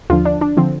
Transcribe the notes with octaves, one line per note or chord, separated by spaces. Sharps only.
D#2 D3 F3 F4
D4
D4
D3 F3 C4